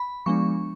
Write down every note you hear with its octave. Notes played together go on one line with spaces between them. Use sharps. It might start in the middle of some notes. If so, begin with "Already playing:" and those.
Already playing: B5
F3 G#3 B3 D4 C#6